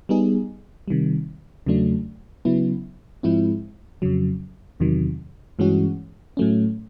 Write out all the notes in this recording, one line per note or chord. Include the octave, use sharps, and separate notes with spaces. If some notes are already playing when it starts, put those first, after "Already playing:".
G3 B3 D#4 G#4
C3 D#3 G3
E2 C#3 F#3 A3 D4
C#3 F#3 B3 E4
G#2 F3 G#3 C4 E4
F2 C#3 F#3
E2 C3 D#3 F#3
G2 E3 G#3 C#4 F#4
A2 F#3 A3 C#4